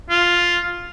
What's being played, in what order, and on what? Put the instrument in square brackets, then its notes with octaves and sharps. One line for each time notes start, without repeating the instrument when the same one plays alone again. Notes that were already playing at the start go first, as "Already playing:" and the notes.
[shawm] F4